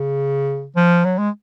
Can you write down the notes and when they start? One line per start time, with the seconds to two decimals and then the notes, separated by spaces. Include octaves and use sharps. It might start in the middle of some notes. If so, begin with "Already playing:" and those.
Already playing: C#3
0.76 F3
1.05 F#3
1.18 G#3